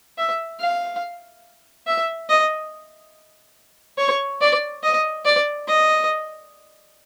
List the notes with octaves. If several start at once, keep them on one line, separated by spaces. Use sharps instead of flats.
E5
F5
E5
D#5
C#5
D5
D#5
D5
D#5